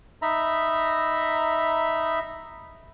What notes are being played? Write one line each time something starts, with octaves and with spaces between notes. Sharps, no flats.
D#4 E5 A#5 B5